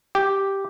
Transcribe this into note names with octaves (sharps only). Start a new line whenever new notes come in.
G4